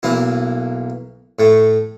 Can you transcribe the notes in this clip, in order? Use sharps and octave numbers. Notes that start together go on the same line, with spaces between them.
B1 E3 A#3 E4
A2 A3